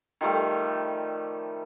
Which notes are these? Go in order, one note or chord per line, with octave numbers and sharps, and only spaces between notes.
D#3 F3 G3 A3